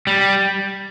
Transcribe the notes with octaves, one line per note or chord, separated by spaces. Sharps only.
G3